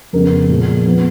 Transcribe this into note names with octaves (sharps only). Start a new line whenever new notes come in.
F2 C#3 G#3 B3 A#4
A#2 F3 G#3
F3 B3